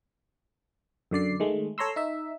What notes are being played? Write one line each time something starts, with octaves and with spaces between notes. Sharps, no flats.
F#2 D3 D5 C7
D#3 G#3 A3
A4 C#5 A#5 C6 E6
D#4 E5